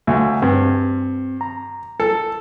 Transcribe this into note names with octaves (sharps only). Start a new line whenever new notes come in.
D2 E5 F5 G#5
G2 C4
A#5
A4